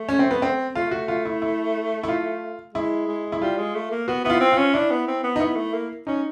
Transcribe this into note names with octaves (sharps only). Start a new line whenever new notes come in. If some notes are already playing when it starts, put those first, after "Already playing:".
Already playing: A3
C#4
C4
B3
C4
A3 F4
F#4
F4
E4
E4
E4
F4
G#3 E4
G#3
E4
G3 F4
G#3
A3
A#3
B3 F#4
B3 E4
F4
C4
F4
C#4
D4 E4
B3
C4
B3
D#4
B3 E4
A3
A#3
C#4 D#4